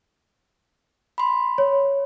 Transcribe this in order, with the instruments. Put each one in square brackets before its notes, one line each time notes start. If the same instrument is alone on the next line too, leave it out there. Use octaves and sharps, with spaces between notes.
[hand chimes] B5 C6
[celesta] C#5